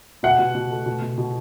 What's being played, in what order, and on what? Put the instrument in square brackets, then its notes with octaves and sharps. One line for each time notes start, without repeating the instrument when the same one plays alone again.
[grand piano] B2 [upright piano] F#5
[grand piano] B2
B2
A3
B2
B2
B2